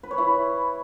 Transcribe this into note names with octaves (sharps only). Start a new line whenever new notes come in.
B4
C#5
E4